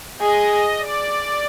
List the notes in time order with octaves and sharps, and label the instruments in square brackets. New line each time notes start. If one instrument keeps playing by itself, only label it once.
[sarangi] G#4 [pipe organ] D#5
[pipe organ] D5